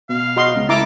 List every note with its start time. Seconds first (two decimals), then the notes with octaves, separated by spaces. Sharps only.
0.09 B2 F5
0.36 F#4 D#5 C6
0.55 C#2
0.69 C#2 E4 A4 A#5 D6